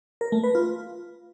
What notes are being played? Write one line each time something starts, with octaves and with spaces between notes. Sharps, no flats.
A#4
A3
B4
F4